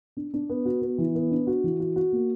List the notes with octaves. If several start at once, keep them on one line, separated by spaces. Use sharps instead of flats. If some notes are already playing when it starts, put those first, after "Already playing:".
D4
D4
B3
F#4
B3
E3
B3
D4
F#4
E3
F#4
F#4
A#3